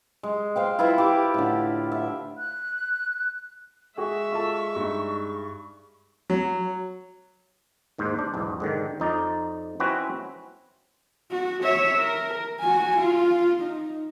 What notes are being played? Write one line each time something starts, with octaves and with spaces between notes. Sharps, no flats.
G#3
C5 F5 G5
E4 F4 B4 E5
G4 D6
A2 D3
E5
F#6
G#3 F#4 G#4 E5 C#6
F4 A4 A5
G2 D#4
F#3
D#2 G#2 C5
D4 C5
B1 E2 G#2
G#2 D3 D#3
F2 D#4 D5
C4 C#4 E4 F#4 B4
F#4
C#5 E5
A#4
F#4 G#5
F4
D#4